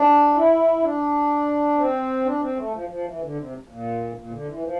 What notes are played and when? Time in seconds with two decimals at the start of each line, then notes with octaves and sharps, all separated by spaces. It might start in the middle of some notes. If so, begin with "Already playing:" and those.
Already playing: D4
0.34 E4
0.82 D4
1.77 C4
2.25 D4
2.41 C4
2.56 A3
2.73 F3
2.89 F3
3.05 E3
3.21 D3
3.37 C3
3.68 A#2
4.16 A#2
4.31 D3
4.47 E3
4.63 F3